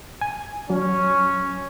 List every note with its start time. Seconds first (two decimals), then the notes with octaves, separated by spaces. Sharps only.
0.21 G#5
0.70 F#3 C#4